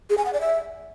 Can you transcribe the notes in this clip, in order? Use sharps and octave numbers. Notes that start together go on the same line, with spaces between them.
G#4
G#5
F#5
D5
E5